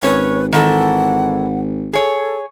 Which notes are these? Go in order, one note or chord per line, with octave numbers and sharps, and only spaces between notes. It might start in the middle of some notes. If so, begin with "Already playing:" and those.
G#1 C#4 B4 C#5
D#3 E3 A4 F#5
G#4 A4 C#5